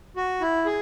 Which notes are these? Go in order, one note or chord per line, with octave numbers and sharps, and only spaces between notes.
F#4
E4
G#4